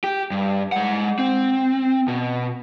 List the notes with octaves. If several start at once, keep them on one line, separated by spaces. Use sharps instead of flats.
G4
G2
G#3 F#5
C4
B2